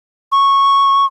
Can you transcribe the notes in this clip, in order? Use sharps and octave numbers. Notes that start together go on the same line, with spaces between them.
C#6